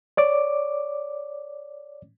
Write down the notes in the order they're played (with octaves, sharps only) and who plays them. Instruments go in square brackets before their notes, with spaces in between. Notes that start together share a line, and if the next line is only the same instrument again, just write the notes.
[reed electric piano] C#5 D5 D6